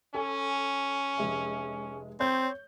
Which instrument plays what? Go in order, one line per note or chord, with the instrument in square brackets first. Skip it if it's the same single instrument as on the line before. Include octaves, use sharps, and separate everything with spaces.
[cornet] C#4 [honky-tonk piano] A4 G#5
[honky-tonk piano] F1 G#3 E5
[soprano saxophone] C4 [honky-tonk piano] C#5 G6